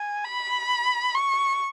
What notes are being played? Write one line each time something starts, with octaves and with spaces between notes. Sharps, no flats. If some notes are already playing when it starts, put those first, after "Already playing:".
Already playing: G#5
B5
C#6